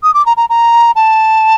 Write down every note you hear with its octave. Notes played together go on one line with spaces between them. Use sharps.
D#6
D6
A#5
A#5
A#5
A5